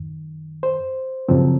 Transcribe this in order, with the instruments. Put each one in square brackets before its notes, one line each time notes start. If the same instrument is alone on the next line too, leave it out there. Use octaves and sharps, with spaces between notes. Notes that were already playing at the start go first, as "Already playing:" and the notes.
Already playing: [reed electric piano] F#2 D#3
C5
F#2 C#3 F3 C4